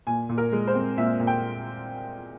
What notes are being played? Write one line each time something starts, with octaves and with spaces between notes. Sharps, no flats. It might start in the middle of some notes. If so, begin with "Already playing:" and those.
A#2 G#5
A#2
A#4
G#3
C5
C4
A#2 E5
A#2
G5